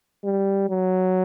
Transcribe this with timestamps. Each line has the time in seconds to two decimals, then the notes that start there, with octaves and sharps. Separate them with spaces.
0.24 G3
0.70 F#3